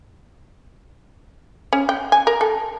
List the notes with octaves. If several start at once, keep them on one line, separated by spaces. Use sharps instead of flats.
C#4
G5
G#5
A#4
A4